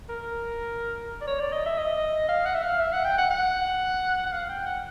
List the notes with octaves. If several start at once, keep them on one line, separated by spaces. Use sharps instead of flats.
A#4
D5
C#5
D5
D#5
E5
D#5
F5
F#5
E5
F5
E5
F#5
G5
F#5
F#5
F#5
F5
G5
F#5